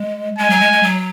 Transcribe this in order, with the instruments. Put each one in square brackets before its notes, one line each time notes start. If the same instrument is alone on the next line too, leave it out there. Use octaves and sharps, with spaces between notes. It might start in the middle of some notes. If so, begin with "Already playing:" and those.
Already playing: [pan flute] G#3
[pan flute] G#3 [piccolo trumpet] G#5
[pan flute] F#3
G#3
G#3
F#3